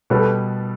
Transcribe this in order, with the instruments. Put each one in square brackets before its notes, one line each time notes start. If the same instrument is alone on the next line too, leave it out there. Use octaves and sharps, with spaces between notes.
[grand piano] B2 G3 B3 [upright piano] A4 B4